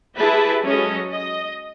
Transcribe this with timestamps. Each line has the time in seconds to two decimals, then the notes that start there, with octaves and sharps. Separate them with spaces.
0.15 E4 G4 G#4 B4 E5 A5
0.64 F#3 G#3 C#4 A4 D#5
1.12 D#5